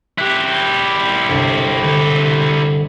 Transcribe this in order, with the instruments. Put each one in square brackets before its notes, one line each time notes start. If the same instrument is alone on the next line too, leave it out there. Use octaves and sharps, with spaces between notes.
[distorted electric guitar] E4 G4 [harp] F#6
[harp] G1 C2 A6
[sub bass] D3